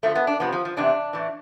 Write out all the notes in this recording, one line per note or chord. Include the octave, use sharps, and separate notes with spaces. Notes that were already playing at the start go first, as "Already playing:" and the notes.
G2 D3 F3 A3
B3
D4
F2 C3 F3 B3
F3
F3
E2 C3 E3 D4
A2 E3